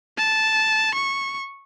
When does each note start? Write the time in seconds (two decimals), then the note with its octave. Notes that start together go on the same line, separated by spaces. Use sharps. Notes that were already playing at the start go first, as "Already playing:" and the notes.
0.18 A5
0.95 C#6